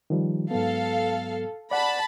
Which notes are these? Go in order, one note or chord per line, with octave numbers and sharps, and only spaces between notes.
D#3 F3 G3
G#2 F#3 B3 A4 F5
D5 F#5 A5 B5